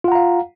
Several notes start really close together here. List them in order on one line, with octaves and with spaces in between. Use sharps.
F4 F#5 A#5 F5